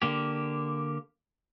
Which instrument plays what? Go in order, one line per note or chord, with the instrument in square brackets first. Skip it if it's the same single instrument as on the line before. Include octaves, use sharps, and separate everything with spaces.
[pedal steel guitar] D3 A#3 G4